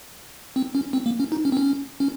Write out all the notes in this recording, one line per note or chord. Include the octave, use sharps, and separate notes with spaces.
C4
C#4
C4
A#3
C#4
D#4
C#4
C4
C#4
C#4